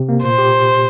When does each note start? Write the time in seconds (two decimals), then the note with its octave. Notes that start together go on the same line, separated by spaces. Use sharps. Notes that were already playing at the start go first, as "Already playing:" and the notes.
Already playing: C3
0.09 A#3
0.23 A#2 C5
0.38 G4